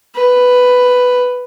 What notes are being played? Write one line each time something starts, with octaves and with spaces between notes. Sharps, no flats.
B4